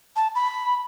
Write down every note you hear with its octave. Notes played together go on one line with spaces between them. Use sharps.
A5
B5